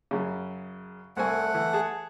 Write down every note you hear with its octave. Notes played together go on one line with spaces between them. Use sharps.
F#2 C#3
C2 A3 C4 F#5 G#5
E3
G#4 A5